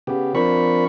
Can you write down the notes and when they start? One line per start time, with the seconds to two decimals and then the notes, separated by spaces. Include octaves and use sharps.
0.07 C#3 B3 G4
0.35 F3 C4 D4 A#4 B5 C#6